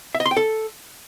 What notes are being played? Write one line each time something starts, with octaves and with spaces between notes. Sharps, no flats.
E5
D#5
C6
G5
A4